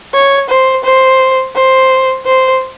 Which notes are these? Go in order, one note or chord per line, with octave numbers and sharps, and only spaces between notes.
C#5
C5
C5
C5
C5